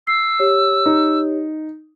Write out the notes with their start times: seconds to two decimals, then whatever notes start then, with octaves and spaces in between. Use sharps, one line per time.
0.07 E6 C7
0.39 G4 C#5
0.86 D#4